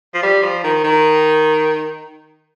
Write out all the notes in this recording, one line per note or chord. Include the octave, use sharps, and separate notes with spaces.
F3
G3
F3
D#3
D#3